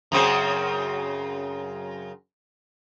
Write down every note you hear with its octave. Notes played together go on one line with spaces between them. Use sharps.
F#2 C#3 C4